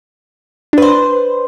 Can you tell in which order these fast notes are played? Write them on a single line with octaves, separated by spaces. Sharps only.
D4 B4 C5